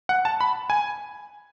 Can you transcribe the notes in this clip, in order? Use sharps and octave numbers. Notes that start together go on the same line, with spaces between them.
F#5
A5
B5
G#5